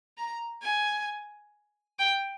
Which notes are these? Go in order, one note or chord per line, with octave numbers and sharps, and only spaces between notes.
A#5
G#5
G5